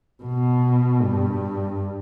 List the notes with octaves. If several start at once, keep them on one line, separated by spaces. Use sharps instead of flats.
B2
G2